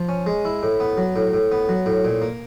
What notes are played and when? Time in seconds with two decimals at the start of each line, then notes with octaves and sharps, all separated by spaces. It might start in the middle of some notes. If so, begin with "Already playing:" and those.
Already playing: F3
0.09 C#4
0.26 G#3
0.45 E4
0.63 A2
0.80 B3
0.98 F#3
1.16 A2
1.33 A2
1.52 B3
1.69 F#3
1.86 A2
2.05 A#2
2.22 A#3